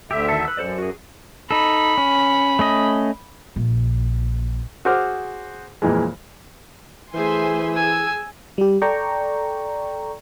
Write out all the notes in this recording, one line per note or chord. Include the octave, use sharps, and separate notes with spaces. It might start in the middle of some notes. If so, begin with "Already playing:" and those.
D2 D3 G4 E5
D#3 A4
B4 E6
F#2 A4 C5 D5
F#4 G#4
D#4 A4 B5
C#4
A3 C#4 D#5
A#1
F#4 G#4 C5 D6 F6
F2 A#2 E3 G#3
E3 A3 G#4 C5 E5 G#5 C6
G#4 G#5 E6
G3 G4
A4 D5 G5 A#5 C#6